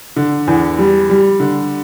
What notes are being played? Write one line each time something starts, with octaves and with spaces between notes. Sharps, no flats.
D3
E2
G3
G3
D3